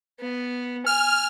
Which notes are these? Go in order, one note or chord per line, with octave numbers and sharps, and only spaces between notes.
B3
G#5 F6